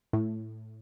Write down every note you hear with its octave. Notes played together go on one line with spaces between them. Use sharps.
A2